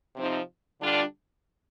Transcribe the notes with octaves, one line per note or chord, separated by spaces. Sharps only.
C3 F3 C4 D#4
D3 G3 D4 F4